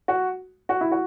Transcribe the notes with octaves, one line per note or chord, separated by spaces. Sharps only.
F#4
F#4
E4
F#4